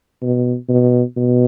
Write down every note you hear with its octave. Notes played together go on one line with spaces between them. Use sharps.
B2
B2
B2